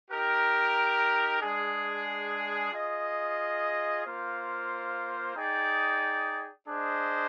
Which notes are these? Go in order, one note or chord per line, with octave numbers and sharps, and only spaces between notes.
D#4 G4 A#4
G#3 D4 G#4
F4 G#4 D#5
A#3 F4 C5
D#4 G#4 D5 G5
D4 G#4 C5 D#5